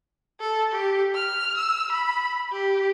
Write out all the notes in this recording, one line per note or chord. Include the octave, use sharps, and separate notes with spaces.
A4
G4
F6
E6
B5
G4